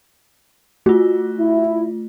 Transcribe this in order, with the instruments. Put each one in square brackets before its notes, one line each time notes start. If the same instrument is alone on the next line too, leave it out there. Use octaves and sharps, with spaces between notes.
[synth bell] A3 F4 [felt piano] F#4
[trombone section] E4